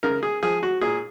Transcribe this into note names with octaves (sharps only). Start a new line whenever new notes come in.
C#3 A#4
G#4
F3 G#4
F#4
A#2 G#4